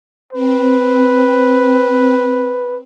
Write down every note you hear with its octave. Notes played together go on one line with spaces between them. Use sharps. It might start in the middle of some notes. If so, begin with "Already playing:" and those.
C4 B4